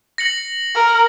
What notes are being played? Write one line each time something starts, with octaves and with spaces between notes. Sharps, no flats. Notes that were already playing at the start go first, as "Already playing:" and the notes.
A#6 C#7 F#7
A#4